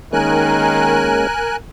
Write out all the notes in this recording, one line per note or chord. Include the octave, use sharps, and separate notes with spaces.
D#3 G#3 A#3 C#4 A#4 G#5 F#6